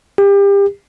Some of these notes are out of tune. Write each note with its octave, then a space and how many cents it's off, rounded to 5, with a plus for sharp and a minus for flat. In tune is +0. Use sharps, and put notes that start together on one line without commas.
G4 +30